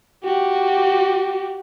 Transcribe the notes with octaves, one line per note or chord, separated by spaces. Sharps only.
F#4 G4